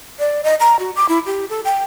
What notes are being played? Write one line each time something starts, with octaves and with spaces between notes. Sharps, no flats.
D5
D#5
A#5
F#4
D6
E4
G4
A4
G5